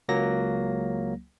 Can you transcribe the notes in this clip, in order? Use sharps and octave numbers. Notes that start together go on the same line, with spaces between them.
C#2 F#3 A#3 A#6